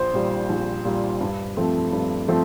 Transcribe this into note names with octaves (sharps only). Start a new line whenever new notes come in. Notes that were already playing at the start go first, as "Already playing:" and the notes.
Already playing: A#1 C5
A#2 G3
A#1
A#2 G3
G2
F3 A3 C4
G2
F3 A3 C4